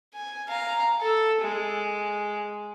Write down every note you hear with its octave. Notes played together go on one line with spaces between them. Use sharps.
G#5
F5 A#5
A4 E6
G#3